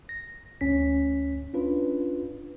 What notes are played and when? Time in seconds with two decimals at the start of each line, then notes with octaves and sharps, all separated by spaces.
0.09 A#6
0.61 D2 C#4 B6
1.54 C#4 D4 F4 B4